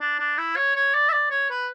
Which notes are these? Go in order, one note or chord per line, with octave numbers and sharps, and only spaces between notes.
D4
D4
E4
C#5
C#5
D5
E5
D5
C#5
B4